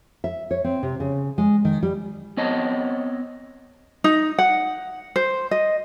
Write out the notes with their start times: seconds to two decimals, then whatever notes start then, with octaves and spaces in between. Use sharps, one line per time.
0.24 E5
0.51 C#5
0.64 C4
0.83 C3
1.00 C#3
1.38 G#3
1.65 D#3
1.83 G3
2.37 B3 C4 C#5 D#5 A5
4.04 D#4
4.38 F#5
5.16 C5
5.51 D#5